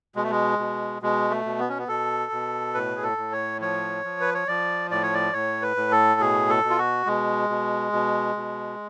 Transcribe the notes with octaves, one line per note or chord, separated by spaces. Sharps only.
B2 G#3
A3
G#3
B2
B2 G#3
A3
B2
B3
C#4
B3
B2 A4
B2
A2 B4
G#4
A4
A2
C#5
F3 C#5
F3
B4
C#5
F3 D5
A2 D5
C#5
D5
A2 C#5
B4
A2
A4
B2 G#4
A4
B2
F4
F#4
B2 G#3
B2
B2
B2